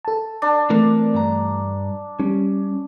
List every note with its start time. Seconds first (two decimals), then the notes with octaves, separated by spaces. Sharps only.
0.05 A4 A5
0.42 D4
0.70 E3 A3 C4 A#4 B4
1.14 G2 A#5
2.20 G3 C#4